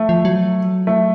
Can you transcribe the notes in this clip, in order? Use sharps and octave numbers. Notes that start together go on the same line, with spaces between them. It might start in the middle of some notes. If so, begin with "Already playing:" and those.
Already playing: A3
F3
F#3
A3